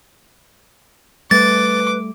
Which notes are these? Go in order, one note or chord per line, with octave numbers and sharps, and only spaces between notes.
G3 A3 B4 D6 A6